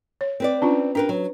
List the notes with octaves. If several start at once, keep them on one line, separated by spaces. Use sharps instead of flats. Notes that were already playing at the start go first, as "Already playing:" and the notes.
C#5
C4 B4 D5
C#4 D4 F4
D4 G4 A#4 B4
F#3